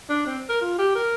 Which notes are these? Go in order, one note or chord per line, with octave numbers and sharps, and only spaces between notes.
D4
C4
A#4
F4
G4
A#4